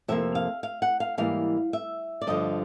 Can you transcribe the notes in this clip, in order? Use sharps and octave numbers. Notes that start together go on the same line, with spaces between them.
F2 C3 F3 A#3 E5
F5
F5
F#5
F5
G#2 E3 G3 A#3 F5
E5
D5
G2 D3 F3 D#5